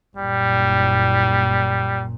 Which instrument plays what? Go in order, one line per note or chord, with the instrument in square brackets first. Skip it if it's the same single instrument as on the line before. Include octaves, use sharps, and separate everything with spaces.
[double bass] F#1 A#2 [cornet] G3